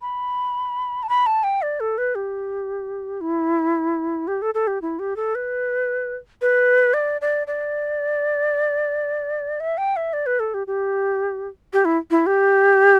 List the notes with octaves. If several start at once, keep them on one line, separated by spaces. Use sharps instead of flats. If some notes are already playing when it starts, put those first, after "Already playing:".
B5
A5
B5
A5
G5
D5
A4
B4
G4
E4
G4
A4
A4
G4
E4
G4
A4
B4
B4
D5
D5
D5
E5
G5
E5
D5
B4
A4
G4
G4
G4
E4
E4
G4